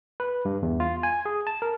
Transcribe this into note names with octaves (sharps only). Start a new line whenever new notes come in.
B4
G2
E2
F4
G#5
G#4
A5
A#4